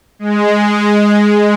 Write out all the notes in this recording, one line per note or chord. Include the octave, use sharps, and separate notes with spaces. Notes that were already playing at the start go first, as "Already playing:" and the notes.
G#3